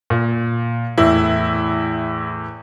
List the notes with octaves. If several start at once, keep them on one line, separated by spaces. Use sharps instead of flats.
A#2
E2 A2 E4